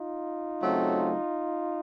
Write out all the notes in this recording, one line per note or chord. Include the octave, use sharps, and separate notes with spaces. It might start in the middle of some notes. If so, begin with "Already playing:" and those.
Already playing: D#4 F4
C#3 F#3 A3 C4